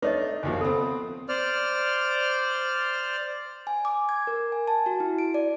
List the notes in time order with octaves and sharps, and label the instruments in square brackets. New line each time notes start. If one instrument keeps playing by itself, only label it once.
[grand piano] A3 D4 D#4 [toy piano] B4 C#5 D#5
[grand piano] F#1 D#2 F3 [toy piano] G#5
[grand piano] B3 C4 [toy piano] A4
[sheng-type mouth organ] C5 D5 F6
[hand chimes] G#5
D6
G#6
A#4
G#5
A5
F#4
E4
D7
D5